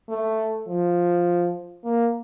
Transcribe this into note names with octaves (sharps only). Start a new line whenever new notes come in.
A3
F3
A#3